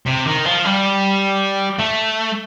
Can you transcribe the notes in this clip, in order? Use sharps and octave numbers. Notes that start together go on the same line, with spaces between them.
C3
D#3
F3
G3
A3